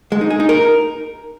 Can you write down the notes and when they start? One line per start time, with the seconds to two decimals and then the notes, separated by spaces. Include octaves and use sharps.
0.12 G#3
0.21 D#4
0.30 G#4
0.40 D#4
0.49 A#4